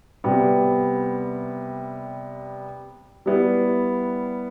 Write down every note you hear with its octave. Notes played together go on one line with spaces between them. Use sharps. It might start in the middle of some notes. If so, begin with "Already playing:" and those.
C3 G3 B3
G3 B3 E4